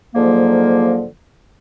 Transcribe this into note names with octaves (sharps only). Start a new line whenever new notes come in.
G#2 D3 F3 F#3 A#3